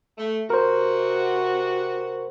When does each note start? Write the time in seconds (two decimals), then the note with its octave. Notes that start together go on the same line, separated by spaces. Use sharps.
0.18 A3
0.50 C3 F#4 A#4 C5